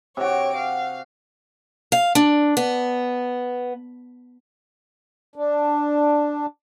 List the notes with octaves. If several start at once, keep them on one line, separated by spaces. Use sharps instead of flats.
C3 F#4 C#5 D7
F5
F5
D4
B3
D4